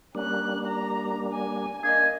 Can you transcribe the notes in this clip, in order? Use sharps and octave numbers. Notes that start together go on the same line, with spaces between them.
G3 A#3 C#4 D4 F#6
A#5
G#5
A#3 D4 D#5 G#5